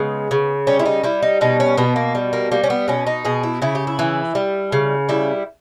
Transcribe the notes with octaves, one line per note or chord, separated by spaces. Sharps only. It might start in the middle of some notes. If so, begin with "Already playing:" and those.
Already playing: C#3 G#3 B3
C#3
G3 C#4
E4
D#4
G3 E4
D#4
B2 D#4
C#4
B2 B3
A#3
G3
A#3
G3 A#3
C#4
B3
B2 C#4
D#4
B2 G#4
E4
C#3 E4
G4
E4
E3
G3
C#3
G3 E4